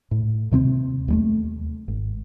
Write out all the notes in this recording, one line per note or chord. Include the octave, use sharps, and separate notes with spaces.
A2
D#2 C3 A#3 C4
D#2 G3 A3
G#1